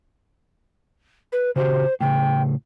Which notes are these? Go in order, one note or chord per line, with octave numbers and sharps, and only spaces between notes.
B4
C#3 F#4 G4 C5
A2 C#3 G5